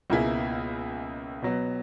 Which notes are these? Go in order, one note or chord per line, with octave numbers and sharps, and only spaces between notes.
C#2 B2 A#3 E4 G#4
B2 F#3 B3